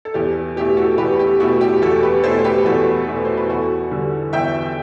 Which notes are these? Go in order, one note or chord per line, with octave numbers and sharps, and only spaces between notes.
A4
E2 G4
B2 A3 E4 G4
F#4 A4
E2 G4 B4
G4
B2 A3 E4 F#4
G4
E2 F#4 A4
G4 B4
B2 A3 E4 A4 C5
C5
G4 B4
E2 F#4 A4
B2 A3 E4
C5
B4
E2 F#4 A4
D3 G3
E2 E5 G5